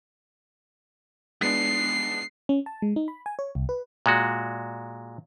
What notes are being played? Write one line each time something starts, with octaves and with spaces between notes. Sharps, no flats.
G#3 B3 D4 C7
C#4
A5
G#3
D#4
B5
G#5
C#5
C2
B4
A#2 G#3 F#4